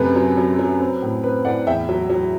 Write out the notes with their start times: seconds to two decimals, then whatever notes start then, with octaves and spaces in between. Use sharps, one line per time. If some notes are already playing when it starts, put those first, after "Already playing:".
Already playing: F#2 C3 A3 B4
0.16 F#3
0.37 F#3
0.59 F#3
0.80 C4
1.03 A2
1.24 C4 B4
1.45 A2 D5 F#5
1.67 E2 E5 G5
1.89 F#3
2.09 F#3